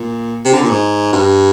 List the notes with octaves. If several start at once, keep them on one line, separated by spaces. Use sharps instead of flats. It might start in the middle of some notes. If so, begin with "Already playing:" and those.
Already playing: A#2
C3
D3
A#2
G#2
G2